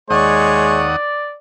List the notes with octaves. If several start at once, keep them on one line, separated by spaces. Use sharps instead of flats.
D#2 G#3 C#5 D5 F#5 D#6